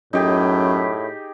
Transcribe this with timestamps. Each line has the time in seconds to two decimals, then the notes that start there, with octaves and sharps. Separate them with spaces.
0.13 F#2 A2 D#4 G4 G#4